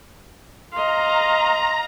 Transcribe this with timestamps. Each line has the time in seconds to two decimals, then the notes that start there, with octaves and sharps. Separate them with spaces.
0.73 D#5 F5 A#5 C6